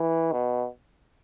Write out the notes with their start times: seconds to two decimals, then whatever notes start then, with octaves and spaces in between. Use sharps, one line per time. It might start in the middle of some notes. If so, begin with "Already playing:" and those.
Already playing: E3
0.32 B2